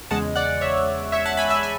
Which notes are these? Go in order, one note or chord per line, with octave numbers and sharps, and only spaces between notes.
E2 C#3 G#3 F#5 A5
D5 F#5
C#5 E5
C#5 E5
F#5 A5
G#5 B5
E5 G#5
E5 G#5